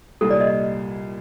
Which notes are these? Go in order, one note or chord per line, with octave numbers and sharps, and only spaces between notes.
C2 A#2 G3 A4
D5
D#5